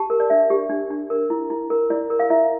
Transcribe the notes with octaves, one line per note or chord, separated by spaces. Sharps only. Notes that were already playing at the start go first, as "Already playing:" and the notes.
Already playing: G4 A5
A#4
D5
D4 E5
G4
D4
D4
A#4
E4
E4
A#4
E4 D5
A#4
F5
E4 E5